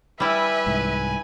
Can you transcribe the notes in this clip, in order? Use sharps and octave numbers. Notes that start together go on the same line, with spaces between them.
G3 E4 B4 E5 G#5
C2 G#2